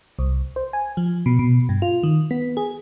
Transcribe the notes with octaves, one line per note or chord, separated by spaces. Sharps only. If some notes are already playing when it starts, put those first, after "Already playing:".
C2
C5
G#5
F3
B2
B2
G2
F4
D#3
B3
G#4